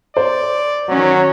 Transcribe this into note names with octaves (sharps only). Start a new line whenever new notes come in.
C5 D5
D#3 F#3 C#4